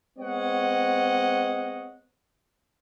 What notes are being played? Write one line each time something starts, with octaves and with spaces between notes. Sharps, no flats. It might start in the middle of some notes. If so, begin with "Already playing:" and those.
G#3 B3 C4 C#5 D#5 F#5